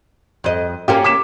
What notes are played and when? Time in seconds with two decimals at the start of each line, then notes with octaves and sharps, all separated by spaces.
0.44 F2 D#5
0.88 A#3 C#4 F4 G4
1.04 D6 B6 E7